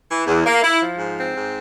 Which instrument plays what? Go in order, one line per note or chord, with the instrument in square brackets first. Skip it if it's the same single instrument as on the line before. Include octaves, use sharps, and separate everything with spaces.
[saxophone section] E3
E2
A#3
E4
F3
G#2
C4
G#2